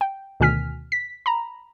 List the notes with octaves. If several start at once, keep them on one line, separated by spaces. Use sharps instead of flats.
G5
D2 B2 D#3 G#5 F6 B6
B6
A#5 B5